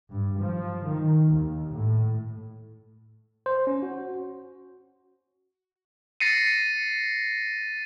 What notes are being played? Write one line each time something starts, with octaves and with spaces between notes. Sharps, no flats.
G2
F3
D#3
D#2
A2
C5
C#4
F#4
A6 A#6 C7 C#7 D#7